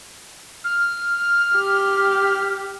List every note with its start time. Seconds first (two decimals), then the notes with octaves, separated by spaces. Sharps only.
0.64 F6
1.56 G4